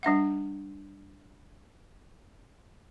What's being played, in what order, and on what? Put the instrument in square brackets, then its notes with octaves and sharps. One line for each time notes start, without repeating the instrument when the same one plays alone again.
[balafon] G3 D4 E5 F#5